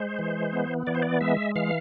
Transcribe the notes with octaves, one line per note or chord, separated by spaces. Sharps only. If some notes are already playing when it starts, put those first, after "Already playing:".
Already playing: G#3 C5
E3
B3
E3 D5
C5
D5
G#3 E5
E3 F5